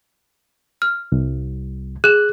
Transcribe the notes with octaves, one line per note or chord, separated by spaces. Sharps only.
F6
C2
G#4 F#6 E7